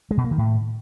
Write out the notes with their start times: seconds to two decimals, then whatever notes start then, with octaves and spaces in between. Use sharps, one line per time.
0.11 G#3
0.17 B2
0.24 A#3
0.31 D#3
0.38 A2